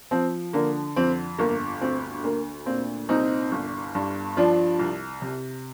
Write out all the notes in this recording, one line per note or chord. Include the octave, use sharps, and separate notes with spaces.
F3 C4
D3 A#3
F2 C4
G1 A#3
D2 C4
D2 A#3
A#2 C4
C2 C4 D#4
G1
G2
F3 D4 F4
C2
C3